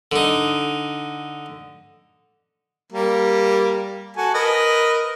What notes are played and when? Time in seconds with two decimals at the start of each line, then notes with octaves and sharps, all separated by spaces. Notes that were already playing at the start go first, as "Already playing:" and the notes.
0.12 D3 D#4
2.92 G3 A#3
4.17 F#4 A4 G#5
4.34 A#4 B4 D#5